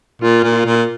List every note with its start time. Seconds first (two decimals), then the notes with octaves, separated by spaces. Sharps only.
0.22 A#2 F4
0.44 A#2
0.55 F4
0.65 A#2